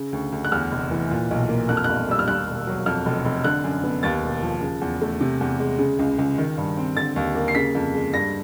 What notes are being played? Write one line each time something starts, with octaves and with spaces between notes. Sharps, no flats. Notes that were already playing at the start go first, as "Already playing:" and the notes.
Already playing: C#3
D2
D2
F#6
E2 F6
F1
E3
A#2
B1
A#3
F2 F#6
F6
G1 F#6
G3 E6
F6
D#2 F#6
E1
F#3
F2 F6
F1
F1
D3 F#6
F#2
B3
D#2 A6
E1
F3
C#3
E2
A3
C3
E2
G#3
C#3
C#2
C#2
D#3
G2
C4
D3 A6
D#2
A#3
C7
C#3 B6
F2
G#3
G2 A#6